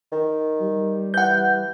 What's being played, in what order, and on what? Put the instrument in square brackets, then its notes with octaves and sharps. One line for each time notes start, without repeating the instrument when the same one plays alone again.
[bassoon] D#3
[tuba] G3
[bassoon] E3 [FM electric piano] F#5 G6